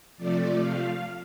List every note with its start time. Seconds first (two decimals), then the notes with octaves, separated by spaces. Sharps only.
0.17 C3 F3 A3 D5
0.61 F5